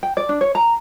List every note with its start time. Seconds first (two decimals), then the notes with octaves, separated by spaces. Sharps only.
0.03 G5
0.17 D5
0.29 D4
0.41 C#5
0.55 A#5